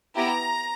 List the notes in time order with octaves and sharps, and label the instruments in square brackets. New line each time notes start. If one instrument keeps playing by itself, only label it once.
[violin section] B3 E4 G4 A#5